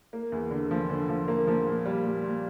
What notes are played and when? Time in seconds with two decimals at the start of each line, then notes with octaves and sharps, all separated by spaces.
0.13 A#3
0.32 E2
0.51 D3
0.71 F3
0.89 D3
1.09 F3
1.28 A#3
1.47 F3
1.66 A#2
1.86 G3
2.05 A#2
2.24 A#2